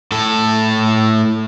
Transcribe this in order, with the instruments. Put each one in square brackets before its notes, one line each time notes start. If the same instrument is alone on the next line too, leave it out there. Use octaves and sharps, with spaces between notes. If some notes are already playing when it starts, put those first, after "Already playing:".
[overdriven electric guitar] A2 A4